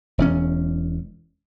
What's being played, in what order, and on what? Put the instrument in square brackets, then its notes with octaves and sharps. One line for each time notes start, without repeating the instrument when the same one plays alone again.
[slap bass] E1 E2 C#4